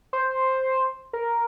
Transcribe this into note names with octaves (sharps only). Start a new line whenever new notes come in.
C5
A#4